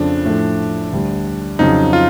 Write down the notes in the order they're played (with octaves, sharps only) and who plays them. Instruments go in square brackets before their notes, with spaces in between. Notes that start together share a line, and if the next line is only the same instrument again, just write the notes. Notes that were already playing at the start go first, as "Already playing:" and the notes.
Already playing: [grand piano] F2 C#3 F3 A3 [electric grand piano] D4
[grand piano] A2 F3 A3
D2 D3 G3
[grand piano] F2 C#3 F#3 [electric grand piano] D#4
[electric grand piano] F4